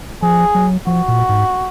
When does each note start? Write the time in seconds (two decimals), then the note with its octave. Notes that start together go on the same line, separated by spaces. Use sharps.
0.22 F3 G#4
0.55 F#3
0.87 F3 F#4
1.08 A#2
1.29 G#2